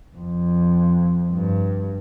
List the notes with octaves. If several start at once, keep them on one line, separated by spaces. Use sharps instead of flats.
F2
G2